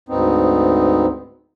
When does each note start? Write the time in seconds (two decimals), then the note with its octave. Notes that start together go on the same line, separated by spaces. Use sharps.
0.09 D2 G#2 B3 C4 D#4